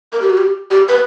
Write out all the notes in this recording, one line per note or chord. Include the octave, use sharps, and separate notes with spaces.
A#4
G4
F#4
G4
G4
B4